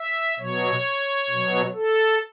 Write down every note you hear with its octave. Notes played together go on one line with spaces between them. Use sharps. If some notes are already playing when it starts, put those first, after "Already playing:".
Already playing: E5
B2 F#3 C#5
B2 F#3
A4